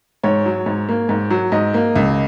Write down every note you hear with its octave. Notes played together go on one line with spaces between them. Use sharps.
G#2 C#5
F#3
G#2
A#3
G#2
F#3
G#2 D#5
A#3
C#2